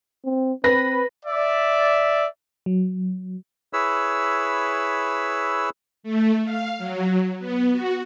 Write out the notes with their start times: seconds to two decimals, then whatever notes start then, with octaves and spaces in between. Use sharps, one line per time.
0.24 C4
0.64 C4 B4 B5 A#6
1.26 D5 E5
2.66 F#3
3.73 E4 G#4 B4 C#5 B5 E6
6.03 A3
6.44 F5
6.78 F#3
7.39 B3
7.73 F#4